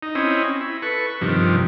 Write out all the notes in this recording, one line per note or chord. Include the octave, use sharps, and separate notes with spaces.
D#4
C4 C#4 E4 D#5
E4
A4 B4 C#6
G2 C3 D#3 F3